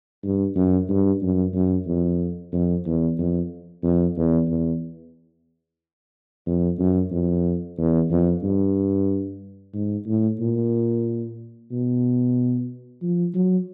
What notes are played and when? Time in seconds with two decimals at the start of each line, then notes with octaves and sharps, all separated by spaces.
0.23 G2
0.55 F#2
0.89 G2
1.22 F#2
1.54 F#2
1.87 F2
2.52 F2
2.86 E2
3.18 F2
3.83 F2
4.17 E2
4.50 E2
6.46 F2
6.79 F#2
7.11 F2
7.78 E2
8.10 F2
8.43 G2
9.74 G#2
10.06 A2
10.40 A#2
11.71 B2
13.02 F3
13.34 F#3